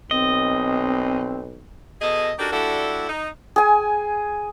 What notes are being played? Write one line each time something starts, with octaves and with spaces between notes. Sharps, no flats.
B1 C4 D#5
B2 G#4 A4 D#5
D4 D#4 F#4 G4 A4 A#4
G3 D4 E4 F#4 A4
D#4
G#4 G#5